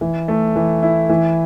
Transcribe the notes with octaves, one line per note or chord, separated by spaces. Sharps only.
E3
A3
E3
E4
E3